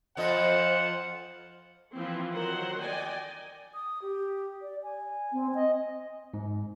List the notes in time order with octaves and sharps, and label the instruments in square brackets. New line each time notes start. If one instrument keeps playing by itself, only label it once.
[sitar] F2 F3 D#5 [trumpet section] F4 C5 F#5
[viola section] E3 F3 C4
D#3 F#3 A#4 C5 F#5
D5 D#5 G5 G#5
[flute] D#6
G4
D5
G#5
[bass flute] C4
D#5
[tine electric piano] G#2